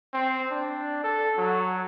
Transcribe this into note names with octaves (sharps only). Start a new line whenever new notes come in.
C4
D4
A4
F#3